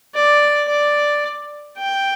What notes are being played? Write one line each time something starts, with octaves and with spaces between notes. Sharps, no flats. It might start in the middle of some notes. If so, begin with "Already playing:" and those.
D5
D5
G5